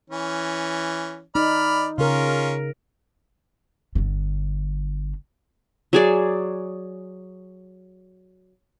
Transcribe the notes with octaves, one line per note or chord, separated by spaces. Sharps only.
E3 C#4
D#4 D5 B5 F6
C#3 C#4 F4 A#4
G1 D3
F#3 G#4 D5